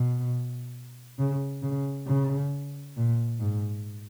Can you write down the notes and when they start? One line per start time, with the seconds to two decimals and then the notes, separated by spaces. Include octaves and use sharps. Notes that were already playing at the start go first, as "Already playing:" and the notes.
Already playing: B2
1.18 C#3
1.62 C#3
2.07 C#3
2.97 A#2
3.40 G#2